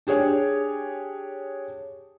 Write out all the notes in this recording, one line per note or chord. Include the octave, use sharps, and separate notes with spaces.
D4 G4 G#4 C#5